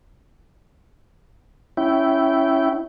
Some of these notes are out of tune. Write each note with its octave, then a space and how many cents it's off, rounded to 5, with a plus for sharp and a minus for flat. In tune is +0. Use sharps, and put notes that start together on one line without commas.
C#4 +0 E4 +0 G5 -20